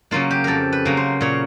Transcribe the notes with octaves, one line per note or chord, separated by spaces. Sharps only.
C#3 F#3 A#3 F4
G4
F2 A4 A#4
B4
C#3 F#3 A#3
C5
A#2 C#5